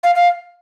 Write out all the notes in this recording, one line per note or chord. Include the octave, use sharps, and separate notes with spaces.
F5
F5